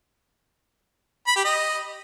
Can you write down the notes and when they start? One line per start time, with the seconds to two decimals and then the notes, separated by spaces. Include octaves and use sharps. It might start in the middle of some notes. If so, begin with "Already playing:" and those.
1.27 B5
1.36 G4
1.45 D#5